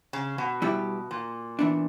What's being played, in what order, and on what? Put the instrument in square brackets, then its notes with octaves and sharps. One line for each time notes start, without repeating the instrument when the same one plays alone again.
[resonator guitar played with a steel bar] C#3
B2
[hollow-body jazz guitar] G3 B3 E4 G4
[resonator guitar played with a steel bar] A#2
[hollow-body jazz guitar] E3 B3 D4